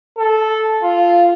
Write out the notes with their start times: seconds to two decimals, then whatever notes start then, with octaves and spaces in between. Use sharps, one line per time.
0.18 A4
0.83 F4